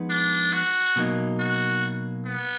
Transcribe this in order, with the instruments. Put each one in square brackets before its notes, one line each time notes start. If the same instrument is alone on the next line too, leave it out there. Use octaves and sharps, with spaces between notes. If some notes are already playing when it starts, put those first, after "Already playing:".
Already playing: [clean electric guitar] F3 G#3 B3 D#4
[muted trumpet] D4
F#4
[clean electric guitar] B2 F#3 A#3 D#4
[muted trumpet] F#4
B3